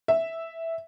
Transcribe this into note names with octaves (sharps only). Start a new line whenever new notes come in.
E5